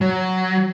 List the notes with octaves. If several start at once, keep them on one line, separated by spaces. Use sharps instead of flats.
F#3